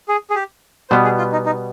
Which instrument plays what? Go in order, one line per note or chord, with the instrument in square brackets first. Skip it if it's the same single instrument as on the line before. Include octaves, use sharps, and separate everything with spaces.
[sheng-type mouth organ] G#4
G#4
G4
[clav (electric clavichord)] B2 G3 B3 [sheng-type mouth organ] C5
[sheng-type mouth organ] G#4
F4
D#4
D#4